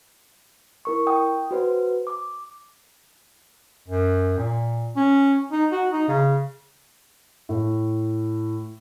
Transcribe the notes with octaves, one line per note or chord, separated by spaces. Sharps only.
E4 A#4 C#6
G5 D#6
F#4 B4 C5
D6
F#2
A#2
C#4
D#4
F#4
D#4
C#3
A2